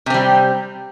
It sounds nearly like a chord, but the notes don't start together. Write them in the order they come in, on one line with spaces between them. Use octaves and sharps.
C3 C4 G3